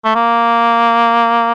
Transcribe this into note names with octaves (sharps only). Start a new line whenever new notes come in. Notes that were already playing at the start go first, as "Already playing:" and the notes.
A3
A#3